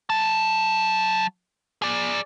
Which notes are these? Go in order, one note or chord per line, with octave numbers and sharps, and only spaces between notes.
F#3 A5
G#4 D5